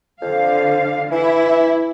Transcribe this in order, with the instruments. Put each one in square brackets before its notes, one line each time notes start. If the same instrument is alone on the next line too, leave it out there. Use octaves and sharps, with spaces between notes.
[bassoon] F2 [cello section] D3 F5
[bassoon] E3 [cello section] E4